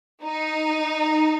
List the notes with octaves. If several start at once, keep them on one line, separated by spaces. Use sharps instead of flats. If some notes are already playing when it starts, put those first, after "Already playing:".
D#4